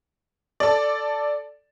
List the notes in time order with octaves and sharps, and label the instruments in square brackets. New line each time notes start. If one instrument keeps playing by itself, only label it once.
[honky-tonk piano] A4 D5